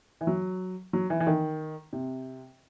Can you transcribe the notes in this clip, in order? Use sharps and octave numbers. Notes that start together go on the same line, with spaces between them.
E3
F#3
F#3
E3
E3
D#3
C3